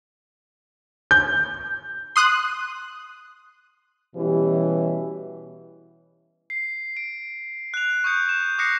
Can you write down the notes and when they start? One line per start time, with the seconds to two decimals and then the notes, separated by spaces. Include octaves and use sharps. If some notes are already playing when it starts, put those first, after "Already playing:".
1.11 G6
2.16 C6 D#6 F#6
4.15 B2 E3 G3 C#4 G4
6.50 C7
6.97 D7
7.74 F#6 F7
8.04 C#6 D#6 G6 C#7
8.29 E7
8.58 D6 D#6 F#6 A#6 C7 C#7